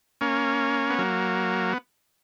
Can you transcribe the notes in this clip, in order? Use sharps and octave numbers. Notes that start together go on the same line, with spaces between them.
A#3 C#4
B3
F#3 A#3
B3